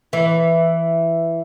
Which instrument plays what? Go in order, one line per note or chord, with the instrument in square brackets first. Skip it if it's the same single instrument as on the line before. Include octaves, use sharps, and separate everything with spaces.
[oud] E3